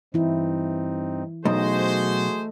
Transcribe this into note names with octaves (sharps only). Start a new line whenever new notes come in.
G2 E3 C4 D#4 E4
B1 A3 F#4 G#4 C5 D#5